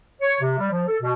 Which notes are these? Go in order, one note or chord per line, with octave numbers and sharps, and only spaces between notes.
C#5
C3
G3
F3
A4
B2